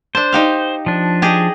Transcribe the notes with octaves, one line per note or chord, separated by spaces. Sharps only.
D4 C5 A5
D#4 G4 F5
F3 D4
G4 G#4 D#5